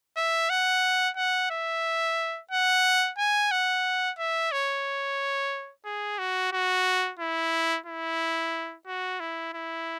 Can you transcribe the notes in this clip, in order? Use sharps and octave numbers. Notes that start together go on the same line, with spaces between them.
E5
F#5
F#5
E5
F#5
G#5
F#5
E5
C#5
G#4
F#4
F#4
E4
E4
F#4
E4
E4